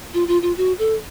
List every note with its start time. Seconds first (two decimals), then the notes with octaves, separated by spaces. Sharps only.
0.14 F4
0.28 F4
0.42 F4
0.57 F#4
0.79 A4